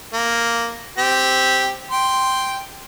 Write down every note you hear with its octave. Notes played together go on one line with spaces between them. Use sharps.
A#3
C4 G4
G5 C6